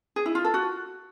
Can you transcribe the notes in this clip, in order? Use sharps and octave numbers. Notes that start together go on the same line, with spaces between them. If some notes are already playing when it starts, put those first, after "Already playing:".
G#4
E4
F4
A4
F#4